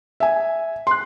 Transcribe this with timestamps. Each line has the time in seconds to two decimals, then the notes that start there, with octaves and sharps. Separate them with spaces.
0.20 E5 G#5
0.87 C6 F#6